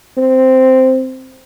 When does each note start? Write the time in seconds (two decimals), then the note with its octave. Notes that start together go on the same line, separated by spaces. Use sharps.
0.17 C4